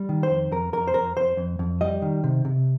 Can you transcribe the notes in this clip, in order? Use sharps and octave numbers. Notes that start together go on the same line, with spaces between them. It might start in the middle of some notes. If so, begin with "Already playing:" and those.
Already playing: G3
D#3
C5
F2
F2 A#4
F2 A#4
C5
F2 A#4
F2 C5
F2
F2
G3 D#5
D#3
C3
C3